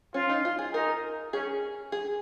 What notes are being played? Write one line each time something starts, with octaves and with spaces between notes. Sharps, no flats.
C#4 F4
D#4
F4
G#4
D#4 A#4
C#4 G#4
G#4